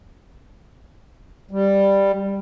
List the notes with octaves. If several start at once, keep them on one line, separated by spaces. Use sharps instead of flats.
G3